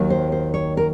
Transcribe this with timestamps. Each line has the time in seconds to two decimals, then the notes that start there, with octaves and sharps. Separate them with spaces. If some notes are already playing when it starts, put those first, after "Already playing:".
Already playing: D#2 D#3 F#3
0.10 C5
0.32 C5
0.54 C#5
0.77 A#4